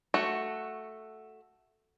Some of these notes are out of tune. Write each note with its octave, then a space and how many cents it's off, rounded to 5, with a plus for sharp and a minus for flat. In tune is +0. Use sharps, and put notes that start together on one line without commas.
A3 +0 F#4 +0